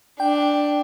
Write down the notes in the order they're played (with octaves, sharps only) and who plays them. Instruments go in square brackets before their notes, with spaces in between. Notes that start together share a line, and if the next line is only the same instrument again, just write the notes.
[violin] D4 [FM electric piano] G5